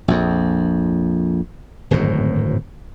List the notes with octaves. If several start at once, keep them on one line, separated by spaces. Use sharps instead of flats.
A#1 F2
D1 G#1 F#2 A2